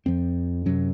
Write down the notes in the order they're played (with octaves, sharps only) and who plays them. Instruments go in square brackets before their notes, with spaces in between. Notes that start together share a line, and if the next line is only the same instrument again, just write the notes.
[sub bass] F2 [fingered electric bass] F3 C4
[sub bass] F#2 [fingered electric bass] C3 F#3 C#4